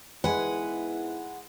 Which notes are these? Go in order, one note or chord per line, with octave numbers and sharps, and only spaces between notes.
G#2 G#3 B3 E4 B4 F#5 G#5